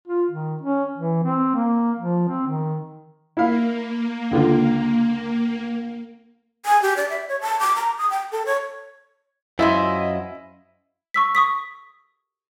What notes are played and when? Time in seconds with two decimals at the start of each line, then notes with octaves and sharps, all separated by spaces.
0.08 F4
0.31 D#3
0.61 C#4
0.98 E3
1.24 C4
1.55 A#3
1.99 F3
2.28 C4
2.47 D#3
3.37 A#3 E4 F5
4.31 C#2 D3 F4
6.66 G#5
6.82 G4
6.97 D5
7.10 E5
7.29 C#5
7.41 A5
7.60 D6
7.76 A#5
7.98 D#6
8.10 G5
8.32 A4
8.46 C#5
9.59 F#2 E4 F4 C5 D#5 E5
11.14 C#6 E6 B6
11.35 C#6 D#6 B6